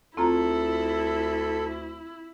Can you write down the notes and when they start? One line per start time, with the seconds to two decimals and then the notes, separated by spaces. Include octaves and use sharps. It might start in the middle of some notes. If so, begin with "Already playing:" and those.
0.17 D2 C4 E4 F4 A4 A#5